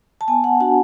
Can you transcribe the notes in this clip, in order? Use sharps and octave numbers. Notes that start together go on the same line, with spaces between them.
A5
B3 G#5
F#5
D4 F#4 F#5